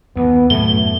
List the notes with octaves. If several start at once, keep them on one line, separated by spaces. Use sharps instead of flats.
D#2 B3
F#2 A2 A3 G7